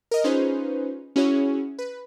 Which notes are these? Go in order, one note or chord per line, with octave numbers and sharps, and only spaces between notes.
A#4 D#5
C#4 D#4 F4 G#4 B4 C5
C#4 E4 F#4 G#4 C#5
B4